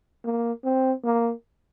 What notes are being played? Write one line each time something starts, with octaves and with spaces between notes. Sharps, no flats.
A#3
C4
A#3